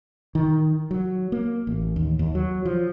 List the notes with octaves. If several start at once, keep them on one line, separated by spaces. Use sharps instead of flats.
D#3
F#3
A#3
A1
D#2
D#2
F#3
F3